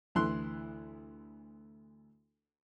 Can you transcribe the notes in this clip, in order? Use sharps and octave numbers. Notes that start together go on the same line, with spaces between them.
D2 E3 E4 C6 F#6